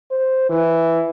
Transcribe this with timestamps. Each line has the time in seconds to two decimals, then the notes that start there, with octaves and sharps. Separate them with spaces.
0.11 C5
0.50 E3